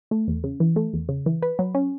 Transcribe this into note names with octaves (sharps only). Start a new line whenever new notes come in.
A3
E2
C#3
E3
A3
E2
C#3
E3
B4
F#3
C#4